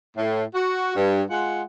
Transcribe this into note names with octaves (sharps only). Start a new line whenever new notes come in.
A2
F#4
G2
G#3 F4 F#5